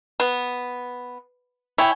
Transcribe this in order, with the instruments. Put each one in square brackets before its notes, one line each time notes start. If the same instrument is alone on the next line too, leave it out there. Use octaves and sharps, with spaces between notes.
[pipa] B3
[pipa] E4 [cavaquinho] C#5 G5 G#5